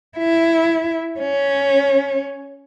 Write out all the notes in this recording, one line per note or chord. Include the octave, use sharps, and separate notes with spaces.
E4
C#4